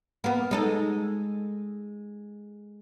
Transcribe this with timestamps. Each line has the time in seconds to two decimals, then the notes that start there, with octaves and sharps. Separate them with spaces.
0.24 A#3 B3
0.51 G#3 D#4 A4